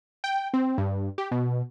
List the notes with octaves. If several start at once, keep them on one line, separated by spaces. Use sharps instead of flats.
G5
C4
G2
G4
B2